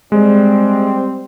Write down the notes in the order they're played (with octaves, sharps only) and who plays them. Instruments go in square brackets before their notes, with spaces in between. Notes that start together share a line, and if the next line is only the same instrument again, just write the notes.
[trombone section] G3 C4 [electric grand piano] G#3